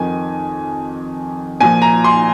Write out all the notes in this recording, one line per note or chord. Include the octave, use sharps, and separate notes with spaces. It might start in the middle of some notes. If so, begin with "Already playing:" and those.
Already playing: F2 D#3 G#5
A#2 F3 G#5
A#5
C6